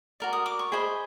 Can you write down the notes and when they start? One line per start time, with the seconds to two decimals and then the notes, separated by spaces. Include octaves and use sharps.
0.20 F#4 A#4 D5
0.33 D#6
0.46 D6
0.59 C#6
0.72 G#4 C5 D#5 B5